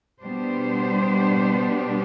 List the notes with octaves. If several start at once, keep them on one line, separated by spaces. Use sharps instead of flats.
B2 G3 B3 D4 C5